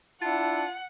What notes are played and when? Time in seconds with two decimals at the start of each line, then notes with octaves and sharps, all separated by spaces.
0.22 D4 E4 F4 F#5 A5